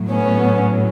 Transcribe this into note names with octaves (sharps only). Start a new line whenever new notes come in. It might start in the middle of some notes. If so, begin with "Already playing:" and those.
Already playing: A2 F#3
B3 C#4